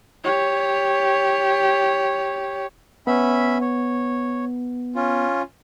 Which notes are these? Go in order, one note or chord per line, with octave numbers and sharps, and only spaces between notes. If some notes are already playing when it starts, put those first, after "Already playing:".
G4 C#5
B3 C#4 E5 B5
C#5
C#4 F4